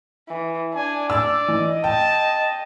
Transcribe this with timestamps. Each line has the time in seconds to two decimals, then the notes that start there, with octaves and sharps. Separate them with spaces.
0.29 E3
0.74 D4 G#5
1.10 D5 E6
1.48 E3 D#5
1.84 G5 A5